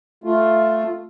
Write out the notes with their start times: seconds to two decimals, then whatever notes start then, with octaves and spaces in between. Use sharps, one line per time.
0.24 A3 F4